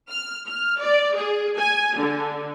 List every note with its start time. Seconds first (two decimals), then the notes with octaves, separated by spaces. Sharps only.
0.10 F6
0.47 F6
0.80 D5
1.15 G#4
1.58 G#5
1.97 D3